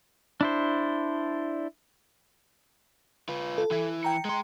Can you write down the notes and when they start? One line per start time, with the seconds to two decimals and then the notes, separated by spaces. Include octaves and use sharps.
0.41 D4 E4 C5
3.29 F4 B4
3.58 A4
3.71 E3 E4
4.03 G5 A#5 C#7
4.25 G#3 C6